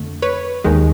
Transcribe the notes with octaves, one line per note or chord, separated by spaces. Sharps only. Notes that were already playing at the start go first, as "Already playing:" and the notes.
Already playing: F2 D3 A3
B4 C#5
D#2 D#3 G#3